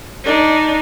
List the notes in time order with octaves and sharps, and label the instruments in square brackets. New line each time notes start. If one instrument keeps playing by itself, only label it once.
[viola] D4 D#4